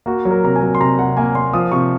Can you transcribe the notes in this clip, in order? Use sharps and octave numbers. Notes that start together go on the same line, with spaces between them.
A#3 F#4
F#3
A#4
C3 A#5
G#5
F#3
C6
C3 A#5
C3 F#5
A#3 G#5
A#3 C6
F3 D#6
C3 C#6